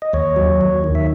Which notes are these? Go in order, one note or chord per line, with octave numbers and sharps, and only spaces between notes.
D#5
D#2 C#5
F#3
D#2
D#3
E5